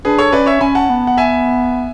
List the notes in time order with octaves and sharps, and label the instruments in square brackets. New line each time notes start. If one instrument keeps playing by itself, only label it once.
[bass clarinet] D4 [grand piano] G#4 B4
[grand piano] A4 C#5
[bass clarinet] C#4 [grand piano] B4 D5
[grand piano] C#5 E5
[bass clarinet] C#4 [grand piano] G#5 B5
[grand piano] F#5 A5
[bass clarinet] B3
[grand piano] F#5
E5 G#5